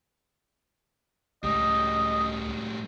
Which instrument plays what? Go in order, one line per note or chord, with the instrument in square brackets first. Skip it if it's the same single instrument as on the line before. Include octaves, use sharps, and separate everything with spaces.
[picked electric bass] C#2 [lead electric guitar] A2 G3 [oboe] D#5